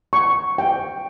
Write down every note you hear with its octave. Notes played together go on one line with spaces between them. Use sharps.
C#6
G5